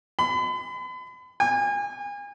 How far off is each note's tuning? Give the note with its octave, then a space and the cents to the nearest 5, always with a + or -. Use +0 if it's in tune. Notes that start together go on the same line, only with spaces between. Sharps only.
B5 +40
G#5 -35